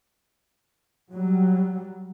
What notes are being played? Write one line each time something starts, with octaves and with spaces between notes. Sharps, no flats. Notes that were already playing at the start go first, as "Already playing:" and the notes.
F#3 G3